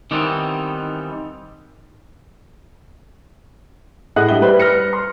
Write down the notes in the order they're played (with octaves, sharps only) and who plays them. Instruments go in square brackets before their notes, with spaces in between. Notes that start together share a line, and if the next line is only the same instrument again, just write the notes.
[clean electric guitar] D#3 E3 G3 B3 C4 D#4
[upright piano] A2 G#4 D#5 F#5 F#6
G2 G4 E5 G7
G3 B4 C5 D5 E5
B4 F6 A#6 C#7
C6